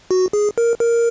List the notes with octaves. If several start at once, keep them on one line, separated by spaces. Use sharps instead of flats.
F#4
G#4
A#4
A#4